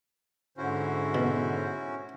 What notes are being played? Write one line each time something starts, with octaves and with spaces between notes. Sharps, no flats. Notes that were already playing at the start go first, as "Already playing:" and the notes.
G#2 D3 C#4 E4 F#4 C5
B2